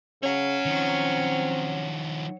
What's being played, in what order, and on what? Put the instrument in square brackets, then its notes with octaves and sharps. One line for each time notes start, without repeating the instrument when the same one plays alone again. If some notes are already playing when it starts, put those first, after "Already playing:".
[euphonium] C#3 [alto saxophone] C#4 [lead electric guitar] C#5 F#5
[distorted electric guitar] D#3 F3 [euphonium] C4